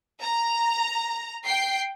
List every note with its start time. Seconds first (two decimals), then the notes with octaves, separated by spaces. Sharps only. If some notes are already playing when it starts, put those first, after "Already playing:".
0.21 A#5
1.45 G5 C7